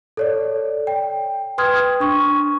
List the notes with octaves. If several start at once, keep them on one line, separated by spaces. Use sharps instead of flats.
A4 C#5 D5
G5
B4 G5 C6 D#6 F6 G#6
D4 C#6